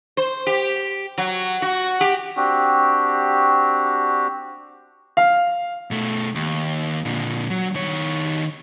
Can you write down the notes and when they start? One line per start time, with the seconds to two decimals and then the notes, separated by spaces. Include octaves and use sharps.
0.17 C5
0.47 G4
1.18 F#3
1.62 F#4
2.01 G4
2.37 C4 D4 F#4 G4
5.17 F5
5.91 B2 A3
6.35 D#2
7.05 A#2 D3
7.50 F#3
7.75 D#3 C#5